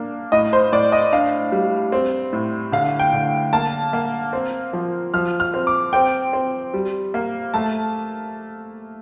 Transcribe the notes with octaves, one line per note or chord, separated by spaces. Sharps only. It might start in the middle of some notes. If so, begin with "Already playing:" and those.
Already playing: A#3 D4
A2 D#5
C5
A2 D5
D#5
D4 F5
G3
C4
A2
D3 F5
G5
D3
A#3 A5
A#3
C4
F3
F3 F6
F6
C4
D6
C4 G5
C4
G3
A#3
A3 A5